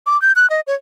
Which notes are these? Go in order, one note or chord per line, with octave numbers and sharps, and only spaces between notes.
D6
G6
F#6
D#5
C#5